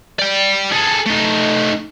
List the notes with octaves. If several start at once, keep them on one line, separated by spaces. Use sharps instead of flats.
D5 G5
G#4 A4
A3 D#4